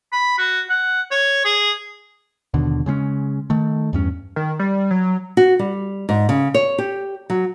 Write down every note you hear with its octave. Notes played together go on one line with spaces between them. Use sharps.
B5
F#4
F#5
C#5
G#4
D#2 B2 D3
C#3 G#3 C4 C#4
D#3 A3
E2 G2 C#4
D#3
G3
F#3
F#4
G3
G#2
C#3
C#5
G4
F#3